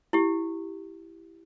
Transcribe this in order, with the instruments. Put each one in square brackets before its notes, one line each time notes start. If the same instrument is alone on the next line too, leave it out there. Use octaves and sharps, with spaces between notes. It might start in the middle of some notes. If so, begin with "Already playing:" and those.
[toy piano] E4 G4